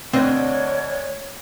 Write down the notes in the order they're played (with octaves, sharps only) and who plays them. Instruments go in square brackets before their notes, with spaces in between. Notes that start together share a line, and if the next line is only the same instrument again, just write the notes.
[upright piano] D2 A#6 [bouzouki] D3 B4 D#5 [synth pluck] C4 [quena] C#5